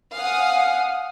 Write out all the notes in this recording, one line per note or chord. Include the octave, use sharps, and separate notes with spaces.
F5 F#5 G#5 D#6 F6